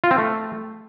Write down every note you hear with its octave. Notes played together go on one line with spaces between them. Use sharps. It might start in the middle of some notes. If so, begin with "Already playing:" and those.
F4
C4
A3